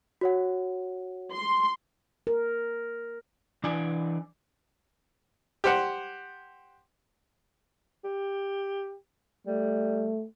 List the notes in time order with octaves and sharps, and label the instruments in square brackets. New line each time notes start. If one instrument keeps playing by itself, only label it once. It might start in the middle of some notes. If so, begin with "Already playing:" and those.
[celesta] F#4 C#5 F#5
[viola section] C6
[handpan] A#4
[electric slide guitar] E3 D4 D5 G#5
[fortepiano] G4 C5 F#5
[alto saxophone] G4
[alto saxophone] G3 [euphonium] A3